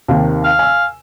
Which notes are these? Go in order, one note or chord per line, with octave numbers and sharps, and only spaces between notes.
D#2 C3 D#3
F5
G#5 E6